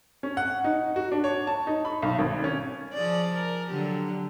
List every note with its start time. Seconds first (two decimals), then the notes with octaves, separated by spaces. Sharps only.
0.23 C#4
0.37 F#5
0.64 D#4
0.96 F#4
1.12 D4
1.24 C#5
1.47 A5
1.67 D#4
1.85 B5
2.02 B1
2.19 G#1
2.44 C#4
2.93 F3 G#4 D5
3.34 A#4
3.69 D3 F#3 G4